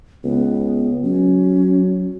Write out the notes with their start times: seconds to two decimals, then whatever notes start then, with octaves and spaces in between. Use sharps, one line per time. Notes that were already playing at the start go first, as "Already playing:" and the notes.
0.24 C#2 B3
1.04 F#3 C#4